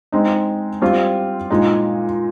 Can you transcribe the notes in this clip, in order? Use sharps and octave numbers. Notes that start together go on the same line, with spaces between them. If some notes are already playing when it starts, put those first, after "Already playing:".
G#3 C4 D#4
G3 C4 F4
A#2 G#3 D#4